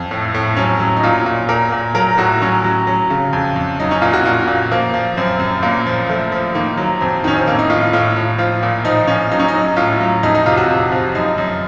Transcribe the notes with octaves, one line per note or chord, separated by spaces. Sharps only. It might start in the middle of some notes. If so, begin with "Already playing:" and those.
Already playing: F2 C4
A2
A2
F#3 C#4
F#3
D#4
A#2 F4
A#2
A#2 A#4
A#2
F#3 A#4
A2 F#4
F#3 C#4
F#3
F#3
C#3
F2
F2
F#3 D#4
C#4
A#2 F4
F#4
A#2 F4
A#2
F3 A#3
F3
F#2 C4
F#2
A#2 A#3
F3
F3 A3
F3
D#3 A#3
F#3
F2 C4
D#3 C#4
C4
A2 A#3
D#4
A2 F4
F4
A2 F4
A2
F3 F4
A#2
F3 D#4
F3 C#4
F#3 D#4
C#4
D#4
F#3
A2 F4
F#3
F2 D#4
D#4
C3 F4
F#4
C3
F3
F#2 D#4
F#2